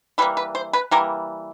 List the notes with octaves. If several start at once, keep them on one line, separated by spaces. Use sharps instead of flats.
E3 G3 A#3 B4
B4
C5
B4
E3 G3 A#3 A#4